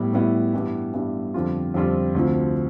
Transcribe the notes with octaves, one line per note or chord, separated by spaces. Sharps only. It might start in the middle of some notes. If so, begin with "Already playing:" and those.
Already playing: A2 G3 B3 E4
A2 G3 B3 E4
G2 E3 G3 B3
G2 E3 G3 B3
F2 D3 G3 C4 F4
F2 D3 G3 C4 F4
D2 C3 F3